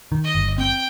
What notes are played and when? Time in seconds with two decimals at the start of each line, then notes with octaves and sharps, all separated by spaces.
0.12 D#3
0.24 D#5
0.35 G1
0.58 C4 G5